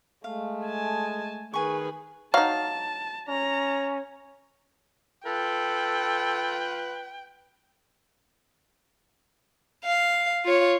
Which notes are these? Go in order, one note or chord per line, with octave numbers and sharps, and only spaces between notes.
G#3 A3 F5
G#5 A5
D#3 G#4 B4 G#5 C#6
F#3 D#4 F5 A5
C#4 A#5
F4 A4 B4 G5
F5
F4 C#5